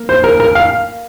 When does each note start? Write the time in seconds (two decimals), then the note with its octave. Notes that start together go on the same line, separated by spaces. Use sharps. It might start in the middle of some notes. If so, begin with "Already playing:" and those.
Already playing: A#3
0.09 C5
0.24 A#4
0.40 A#4
0.55 F5